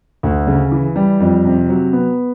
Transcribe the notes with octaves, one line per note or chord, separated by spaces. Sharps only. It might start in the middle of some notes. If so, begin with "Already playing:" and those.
D2
C#3
E3
G3
F2
C3
F#3
B3